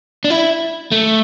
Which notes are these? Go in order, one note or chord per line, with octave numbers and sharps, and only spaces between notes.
D4
E4
A3